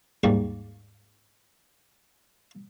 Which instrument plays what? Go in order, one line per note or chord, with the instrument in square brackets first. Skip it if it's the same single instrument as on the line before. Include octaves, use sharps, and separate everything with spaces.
[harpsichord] D#2 G#2 G3 A#3